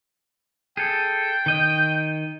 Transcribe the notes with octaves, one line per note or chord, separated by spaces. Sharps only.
G#4 A4 G5
D#3 D#5 G6